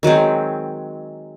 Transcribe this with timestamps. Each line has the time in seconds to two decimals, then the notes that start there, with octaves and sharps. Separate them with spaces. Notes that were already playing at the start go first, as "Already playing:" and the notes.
0.03 D#3 F#3 G#3 C4